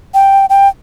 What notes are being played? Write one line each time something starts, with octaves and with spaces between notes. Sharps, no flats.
G5
G5